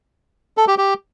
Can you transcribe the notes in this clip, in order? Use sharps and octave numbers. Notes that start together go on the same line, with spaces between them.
A4
G4
G4